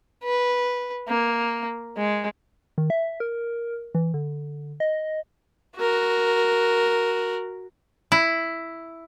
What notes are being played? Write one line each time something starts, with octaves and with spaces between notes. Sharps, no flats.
B4
A#3
G#3
D#3
E5
A#4
E3
D3
D#5
F#4 A#4
E4